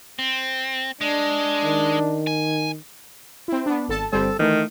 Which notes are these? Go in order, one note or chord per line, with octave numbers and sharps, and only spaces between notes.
C4
G#3 D4
D#3
G#5
C4 E4
B3 D4
G#1 A4 A5
G1 G3 C4 A4
D#3 E3 A3